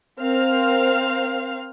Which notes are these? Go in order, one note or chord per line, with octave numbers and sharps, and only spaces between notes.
C4 A#4 C5 F5 F6